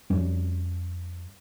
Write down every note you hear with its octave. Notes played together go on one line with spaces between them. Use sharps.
F2 G3 C#4